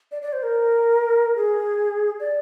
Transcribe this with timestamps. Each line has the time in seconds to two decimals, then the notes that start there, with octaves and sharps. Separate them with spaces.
0.12 D5
0.22 D5
0.33 C5
0.43 A#4
1.36 G#4
2.20 D5